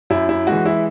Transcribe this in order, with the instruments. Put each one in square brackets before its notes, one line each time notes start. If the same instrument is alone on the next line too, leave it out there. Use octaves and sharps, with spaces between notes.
[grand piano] F#2 E4
E4
E3 G#3 F#4
E4